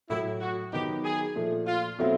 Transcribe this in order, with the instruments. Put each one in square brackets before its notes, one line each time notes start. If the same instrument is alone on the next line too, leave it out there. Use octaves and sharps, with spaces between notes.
[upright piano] A2 F#3 A3 [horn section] E4
[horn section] F#4
[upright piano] D#3 F#3 B3 D#4 [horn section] G4
[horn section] G#4
[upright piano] A#2 F3 A3
[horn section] F4
[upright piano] B2 F#3 A3 C4 E4